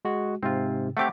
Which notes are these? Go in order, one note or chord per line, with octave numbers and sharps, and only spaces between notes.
G#3 F#4
G#2 C3 C4 F4
A3 C4 G4 F#5 D6